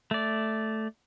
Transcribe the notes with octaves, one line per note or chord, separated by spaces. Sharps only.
A3 D5